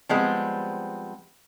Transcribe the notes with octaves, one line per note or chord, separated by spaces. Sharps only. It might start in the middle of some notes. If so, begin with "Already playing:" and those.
F3 G3 G#3 B3 C4